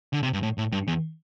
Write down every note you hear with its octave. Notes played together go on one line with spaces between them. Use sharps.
D3
C3
G2
A2
A2
G2
E2